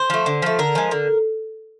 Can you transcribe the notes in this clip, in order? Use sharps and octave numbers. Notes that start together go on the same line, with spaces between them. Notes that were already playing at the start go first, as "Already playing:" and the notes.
Already playing: C5
F3 A3
D3
F3 A3
D3 A#4
F3 G#3
D3